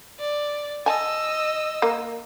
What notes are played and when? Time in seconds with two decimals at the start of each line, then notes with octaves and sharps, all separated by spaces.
0.20 D5
0.86 D#5 G#5 A5 E6
1.82 A#3